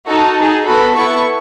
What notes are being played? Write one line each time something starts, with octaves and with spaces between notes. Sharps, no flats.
D#4 F#4 A4 A5
D#4 G#4
B3 F#4 A4 B5
B3 E4 A4 C#6